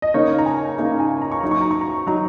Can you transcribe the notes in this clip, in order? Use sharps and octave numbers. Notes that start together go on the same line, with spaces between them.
D#5
C#3 A#3 D#4 C#5
A#5
G#5
C#3 A#3 D#4
G#5
A#5
C#6
F#3 D#4 A#5
C#6
A#5
C#6
A#5
F#3 D#4 A#5